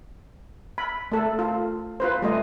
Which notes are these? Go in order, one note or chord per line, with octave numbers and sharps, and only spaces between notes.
B5
A3 A4
F4
F4 B4 C5
G3 A3 D#5